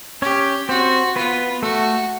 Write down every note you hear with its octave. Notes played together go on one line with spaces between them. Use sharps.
C#4 G4 C#5
C4 F#4 C5
B3 F4 B4
A3 F#4 A4